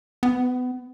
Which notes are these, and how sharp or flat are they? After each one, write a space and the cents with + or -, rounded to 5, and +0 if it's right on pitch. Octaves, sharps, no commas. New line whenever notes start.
B3 +25